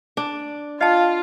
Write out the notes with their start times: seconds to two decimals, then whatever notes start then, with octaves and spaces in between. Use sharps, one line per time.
0.17 D4
0.81 F4 D#5 F5 A5